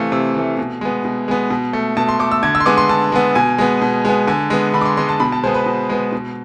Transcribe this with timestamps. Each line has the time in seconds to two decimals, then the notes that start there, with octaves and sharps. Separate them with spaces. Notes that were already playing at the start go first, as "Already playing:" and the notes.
Already playing: C3 E3 A3 E5 F5
0.12 C3
0.35 E3 A3
0.58 B2
0.81 G#3 B3
1.05 B2
1.28 G#3 B3
1.50 B2
1.73 A3
1.97 B2 A5
2.09 C6
2.19 A3 D6
2.31 E6
2.43 D3 G#6
2.55 E6
2.60 C6
2.66 G#3 B3 D6
2.78 C6
2.89 D3 A5
3.12 G#3 B3
3.35 B2 G#5
3.58 G#3 B3
3.82 B2
4.05 G#3 B3
4.27 D3 G#5
4.50 G#3 B3
4.74 D3 B5
4.81 D6
4.85 C6
4.97 G#3 B3 C6
5.09 A5
5.20 B2 B5
5.32 A5
5.44 G#3 B3 C5
5.54 B4
5.66 B2
5.89 G#3 B3
6.12 B2